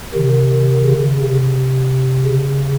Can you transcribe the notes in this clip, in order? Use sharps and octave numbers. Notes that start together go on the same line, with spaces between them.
C3 D#3
C#3
C3
C#3